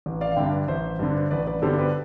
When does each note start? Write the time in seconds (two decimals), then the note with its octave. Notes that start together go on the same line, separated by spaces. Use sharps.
0.06 A1
0.21 D5 F5
0.32 F5
0.36 G2 D3 E5 G5
0.68 A1 C5 E5
0.99 G2 D3
1.31 A1 B4 D5
1.47 B4 D5
1.62 G2 D3 G3 B3 A4 C5
1.78 G4 B4